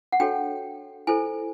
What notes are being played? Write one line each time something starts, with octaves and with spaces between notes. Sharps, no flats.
F#5
D4 F#4 A4 C#5 G5
E4 A4 C5 G#5